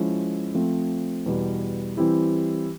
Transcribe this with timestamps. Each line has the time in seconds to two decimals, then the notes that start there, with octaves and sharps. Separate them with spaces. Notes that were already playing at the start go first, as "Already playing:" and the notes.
Already playing: F3 G#3 C#4 E4
0.55 F3 A3 C4
1.26 E2 B2 G3
1.97 E3 G3 C4 E4 G4